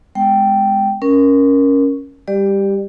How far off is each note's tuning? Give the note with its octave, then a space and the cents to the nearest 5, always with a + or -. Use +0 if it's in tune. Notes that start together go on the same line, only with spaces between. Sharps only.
G#3 +0 B3 +35 G5 -10
C#4 +0 A#4 +10
G3 +25 G4 +0 D5 +20